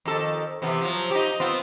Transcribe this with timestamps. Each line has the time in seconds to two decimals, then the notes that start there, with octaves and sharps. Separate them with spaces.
0.05 F2 D#3 A4
0.62 C3 E3 B3
0.81 F3 F#3
1.11 D#4 G4
1.40 B3 C4 F4